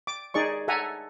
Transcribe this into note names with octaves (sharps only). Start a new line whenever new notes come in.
D6
D#4 G#4 D5 C#6
A4 E5 F#5 G#5 A#5